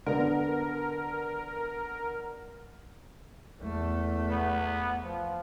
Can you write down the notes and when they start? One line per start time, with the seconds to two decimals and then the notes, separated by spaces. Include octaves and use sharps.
0.06 D3 B3 A#4
3.61 E2 A3
4.30 B3
5.04 F3